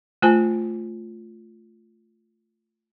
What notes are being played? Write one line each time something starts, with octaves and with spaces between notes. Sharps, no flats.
A3 F4 C5 G#5 A5